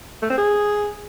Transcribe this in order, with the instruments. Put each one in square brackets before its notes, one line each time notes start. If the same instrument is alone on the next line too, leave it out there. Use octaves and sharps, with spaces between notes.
[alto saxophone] A3
C4
G#4